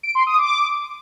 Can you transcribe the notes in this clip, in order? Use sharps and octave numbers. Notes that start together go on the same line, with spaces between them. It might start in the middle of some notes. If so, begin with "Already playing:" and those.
D7
C6
D#6
D6